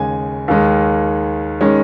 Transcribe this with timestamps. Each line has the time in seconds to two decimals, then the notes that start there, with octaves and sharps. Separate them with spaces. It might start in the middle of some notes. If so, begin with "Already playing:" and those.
Already playing: D#2 C#3 G#3 G#5
0.48 D#2 D#3 G#3
1.61 D#3 G#3 C#4